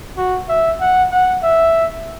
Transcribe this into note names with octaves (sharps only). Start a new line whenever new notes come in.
F#4
E5
F#5
F#5
E5